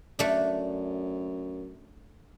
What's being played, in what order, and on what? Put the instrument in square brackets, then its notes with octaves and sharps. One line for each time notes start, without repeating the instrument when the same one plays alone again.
[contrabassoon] F#2 [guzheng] A3 D4